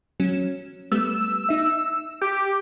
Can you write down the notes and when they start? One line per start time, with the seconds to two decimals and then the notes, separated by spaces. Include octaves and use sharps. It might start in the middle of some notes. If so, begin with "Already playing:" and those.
0.20 F#3 C#4 E7
0.92 G3 A3 B3 E6
1.49 D#4 E5
2.22 G4